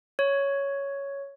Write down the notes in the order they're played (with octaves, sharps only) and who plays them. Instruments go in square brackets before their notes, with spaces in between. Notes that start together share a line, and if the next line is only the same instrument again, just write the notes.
[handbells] C#5